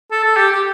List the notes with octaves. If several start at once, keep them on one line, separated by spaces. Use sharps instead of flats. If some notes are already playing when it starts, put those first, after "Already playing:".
A4
A4
G4
G4